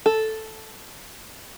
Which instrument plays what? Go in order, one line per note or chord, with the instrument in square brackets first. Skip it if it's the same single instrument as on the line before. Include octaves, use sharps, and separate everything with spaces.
[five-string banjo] A4